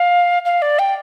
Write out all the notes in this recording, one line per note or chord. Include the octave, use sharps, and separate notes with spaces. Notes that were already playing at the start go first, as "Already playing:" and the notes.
Already playing: F5
F5
D5
G5